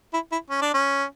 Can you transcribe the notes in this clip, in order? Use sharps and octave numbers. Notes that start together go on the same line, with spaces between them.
E4
E4
C#4
D4
C#4